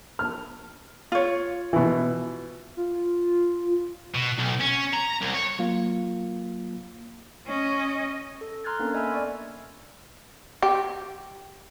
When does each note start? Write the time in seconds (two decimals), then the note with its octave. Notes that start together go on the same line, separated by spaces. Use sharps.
0.19 F6
1.12 F4 C#5
1.73 B2 E3
2.77 F4
4.15 B2
4.39 B1
4.61 C#4
4.94 A#5
5.22 C2
5.34 C#5
5.59 F#3 A#3 F4 F5
7.47 C#4 D#5
8.41 A4
8.64 A#5 C6 F6 F#6 G#6 A6
8.79 A#3 B3 C#4 D4 A4 A#4
8.94 D#5 E5 G#5 B5 E6 F6
9.11 D5 C#6 G#6
10.62 G4